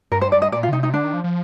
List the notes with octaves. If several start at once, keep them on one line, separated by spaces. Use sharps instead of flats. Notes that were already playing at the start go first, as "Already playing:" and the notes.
G2 A#4
C5
D5
D#5
A#2 D5
F4
D3
C3 D#4
D#4
D3 D4
D#3
F3
F3